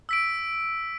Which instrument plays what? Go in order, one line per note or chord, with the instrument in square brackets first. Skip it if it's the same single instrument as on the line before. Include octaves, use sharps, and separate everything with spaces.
[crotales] E6 B6 D7